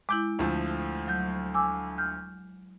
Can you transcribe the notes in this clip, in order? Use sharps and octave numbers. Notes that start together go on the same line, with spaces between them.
G#3 E4 D6 G6
D2 F3 A3
F#3 G6
G#5 D6 E6
F6 G6